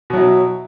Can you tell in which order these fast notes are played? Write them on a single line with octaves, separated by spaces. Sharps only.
B2 F#3 E4